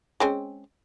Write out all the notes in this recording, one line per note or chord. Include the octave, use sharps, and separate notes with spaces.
G#3 C4 C#4